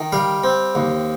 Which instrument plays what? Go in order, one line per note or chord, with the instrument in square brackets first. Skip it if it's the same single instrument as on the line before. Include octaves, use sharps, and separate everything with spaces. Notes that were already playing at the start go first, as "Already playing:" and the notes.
Already playing: [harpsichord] D#3
G3 F5
C4
D#2